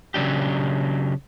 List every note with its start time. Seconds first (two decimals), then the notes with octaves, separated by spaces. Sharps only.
0.14 C#3 F#3 D4 G4